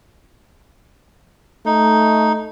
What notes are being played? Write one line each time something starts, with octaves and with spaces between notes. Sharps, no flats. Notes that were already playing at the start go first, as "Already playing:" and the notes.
A3 D#4